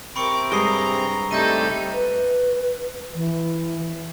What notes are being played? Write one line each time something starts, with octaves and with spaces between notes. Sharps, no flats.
C3 C4 A#4 B5 C#6 D6 C#7
G2 G#3 D#5 A#5 C7 G7
C3 G3 A3 D#4 A4 G6 A#6 D#7
B4
E3